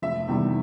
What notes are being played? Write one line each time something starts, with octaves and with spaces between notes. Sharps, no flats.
F1 E5
E2 C3 D#3 G3